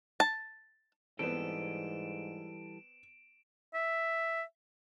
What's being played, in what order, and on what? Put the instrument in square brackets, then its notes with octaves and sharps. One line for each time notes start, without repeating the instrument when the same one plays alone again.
[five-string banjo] A5
[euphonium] G#2 [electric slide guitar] E3 G3 A4 [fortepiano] B3 C4 [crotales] D7 E7
[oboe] E5